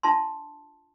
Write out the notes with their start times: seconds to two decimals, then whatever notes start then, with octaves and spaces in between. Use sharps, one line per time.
0.03 D4 F4 A5 C6